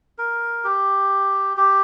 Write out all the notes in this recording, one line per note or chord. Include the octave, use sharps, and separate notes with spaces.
A#4
G4
G4